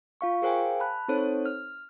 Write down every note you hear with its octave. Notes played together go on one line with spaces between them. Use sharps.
F4 F5 C#6
G#4 A#4 C5 F5 G5 G#5
A5 B5 F#6
C4 D#4 A4 C5 C#5
F6